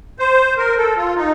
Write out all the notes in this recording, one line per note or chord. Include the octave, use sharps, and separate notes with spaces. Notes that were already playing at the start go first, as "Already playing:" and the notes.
C5
A#4
A4
F4
D#4